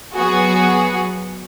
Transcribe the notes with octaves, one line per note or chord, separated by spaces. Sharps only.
F#3 B3 F#4 G#4